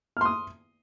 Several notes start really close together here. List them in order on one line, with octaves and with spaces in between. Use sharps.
F6 C6 D#6